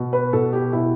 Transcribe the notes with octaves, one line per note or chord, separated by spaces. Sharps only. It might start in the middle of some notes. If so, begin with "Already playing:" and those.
Already playing: B2
B4
B2 A4
G4
B2 E4